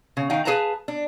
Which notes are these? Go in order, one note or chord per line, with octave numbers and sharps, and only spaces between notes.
C#3
D#3 D#4 F5 G5
G#4 A4 B4 F5 A5 A#5
D4